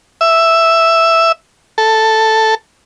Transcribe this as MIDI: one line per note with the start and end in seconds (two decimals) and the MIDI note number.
0.21 1.32 76
1.78 2.55 69